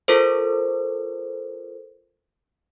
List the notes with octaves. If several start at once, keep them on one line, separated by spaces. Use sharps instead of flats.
F4 A4 A#4 C5